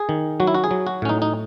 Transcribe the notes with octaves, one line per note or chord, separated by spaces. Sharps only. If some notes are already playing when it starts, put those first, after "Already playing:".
Already playing: G#4
D#3
F#3 F#4
E4
F#4
G#4
F#3
F#4
A2 C#4
D#4
D#4